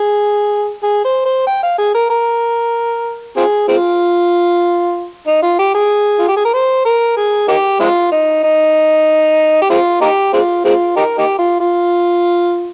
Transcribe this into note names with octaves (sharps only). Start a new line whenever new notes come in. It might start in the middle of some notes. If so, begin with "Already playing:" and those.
Already playing: G#4
G#4
C5
C5
G5
F5
G#4
A#4
A#4
C4 F4 G#4
G#3 C4 F4
D#4
F4
G4
G#4
F4
G4
G#4
A#4
C5
A#4
G#4
A#3 D#4 G4
G#3 C4 F4
D#4
D#4
G4
G#3 C4 F4
A#3 D#4 G4
G#3 C4 F4
G#3 C4 F4
D#4 G4 A#4
A#3 D#4 G4
F4
F4